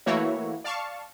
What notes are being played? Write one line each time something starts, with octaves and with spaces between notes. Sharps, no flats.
E3 A3 A#3 E4 F#4 C#5
D5 F5 A5 C#6